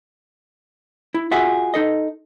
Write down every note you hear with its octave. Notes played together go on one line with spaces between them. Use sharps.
E4
F4 F#4 G#4 E5 F#5
D#4 A4 D#5